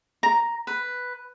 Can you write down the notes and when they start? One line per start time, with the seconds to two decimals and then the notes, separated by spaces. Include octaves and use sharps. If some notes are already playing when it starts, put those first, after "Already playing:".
0.23 A#5
0.67 B4